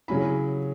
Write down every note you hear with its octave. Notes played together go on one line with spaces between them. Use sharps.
C#3 F#3 C#4 E4 B5